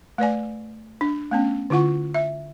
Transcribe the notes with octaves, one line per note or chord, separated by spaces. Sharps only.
A3 B4 D5 G#5
D4
A3 B3 C#4
D3 E4 F4 F#5 C#6
E5